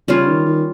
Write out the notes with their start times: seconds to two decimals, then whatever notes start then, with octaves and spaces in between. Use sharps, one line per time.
0.08 C#3 G3 C#4 F4
0.27 D#3
0.45 D#3